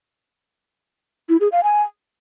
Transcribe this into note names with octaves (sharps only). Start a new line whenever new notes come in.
E4
G#4
F5
G#5